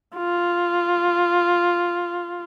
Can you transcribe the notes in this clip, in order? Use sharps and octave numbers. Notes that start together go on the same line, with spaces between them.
F4